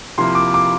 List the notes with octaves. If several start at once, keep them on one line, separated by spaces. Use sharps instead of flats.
C3 F3 A#3 E4 C6
D6
D6